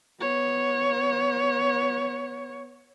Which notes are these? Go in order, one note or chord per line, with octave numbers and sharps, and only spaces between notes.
B3 C#5